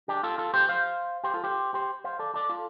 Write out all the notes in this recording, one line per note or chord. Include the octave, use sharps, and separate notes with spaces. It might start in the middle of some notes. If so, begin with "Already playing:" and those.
D4 G4
F4 A4
F4 A4
G4 C5
C5 F5
G4 C5
F4 A4
G4 C5
G4 C5
C5 F5
A4 D5
A4 D5
F4 A4